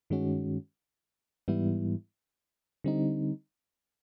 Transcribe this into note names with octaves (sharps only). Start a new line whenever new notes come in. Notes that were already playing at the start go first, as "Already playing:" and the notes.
G2 D#3 G#3 C#4 F#4
G#2 E3 G3 B3 E4
D3 G3 C4 D#4